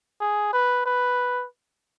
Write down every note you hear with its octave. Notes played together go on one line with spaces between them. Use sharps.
G#4
B4
B4